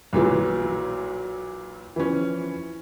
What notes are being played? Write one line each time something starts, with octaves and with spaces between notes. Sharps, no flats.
B1 A#2 E3 F#3
E3 F3 C#4